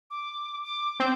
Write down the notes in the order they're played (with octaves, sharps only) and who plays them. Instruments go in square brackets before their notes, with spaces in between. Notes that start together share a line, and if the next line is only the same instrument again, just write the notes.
[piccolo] D6
D6
[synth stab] C4 [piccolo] G6